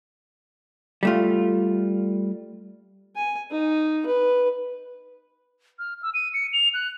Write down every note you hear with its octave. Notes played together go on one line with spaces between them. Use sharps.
G3 A3 F4
G#5
D#4
B4
F6
E6
D#7
C#7
F7
F#6